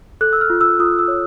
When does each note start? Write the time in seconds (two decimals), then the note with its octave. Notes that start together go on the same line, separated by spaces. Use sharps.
0.21 A4 F#6
0.33 E6
0.41 F6
0.50 F4
0.61 E6
0.79 F4 D#6
0.99 E6
1.08 C#5